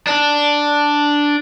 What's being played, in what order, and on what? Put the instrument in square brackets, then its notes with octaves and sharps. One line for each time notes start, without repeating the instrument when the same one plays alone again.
[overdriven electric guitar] D4